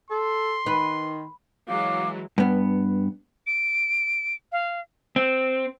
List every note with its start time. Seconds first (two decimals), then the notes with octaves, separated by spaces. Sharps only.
0.10 A4 C6
0.66 D#3 B4
1.69 E3 F#3 G#3 F5 D6
2.38 G2 B3
3.47 D7
4.52 F5
5.16 C4